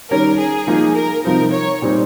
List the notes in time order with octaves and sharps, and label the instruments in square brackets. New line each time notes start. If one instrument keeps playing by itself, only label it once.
[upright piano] D#3 G3 C#4 [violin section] A#4
[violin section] G#4
[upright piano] F3 A#3 D#4
[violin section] A#4
[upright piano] C3 F3 C4 D#4 [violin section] A#4
[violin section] C#5
[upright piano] A#2 G3 C4 D#4